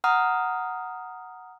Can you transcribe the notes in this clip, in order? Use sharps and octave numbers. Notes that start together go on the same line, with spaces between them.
F#5 A#5 D#6 F6